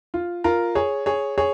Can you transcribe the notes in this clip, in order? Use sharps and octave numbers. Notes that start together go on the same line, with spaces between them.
F4
F4 A#4
G#4 C#5
G#4 C#5
G#4 C#5